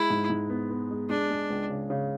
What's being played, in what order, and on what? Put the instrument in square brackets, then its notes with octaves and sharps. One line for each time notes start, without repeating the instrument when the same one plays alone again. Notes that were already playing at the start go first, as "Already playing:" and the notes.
Already playing: [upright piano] G#3 [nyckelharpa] E4
[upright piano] G#2
G#2
B3
B3
G#3
[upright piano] G#3 [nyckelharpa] D4
[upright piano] G#3
C#2
C#3
C#3